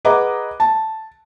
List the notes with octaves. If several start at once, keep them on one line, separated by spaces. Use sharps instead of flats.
G#4 B4 D#5 F#5 A#5 D6
A5